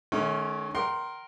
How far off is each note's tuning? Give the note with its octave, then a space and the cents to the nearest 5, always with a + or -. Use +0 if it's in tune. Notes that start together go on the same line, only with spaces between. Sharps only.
D#3 -30 A3 -45 C#4 +0
A#4 +0 G5 -40 C6 +10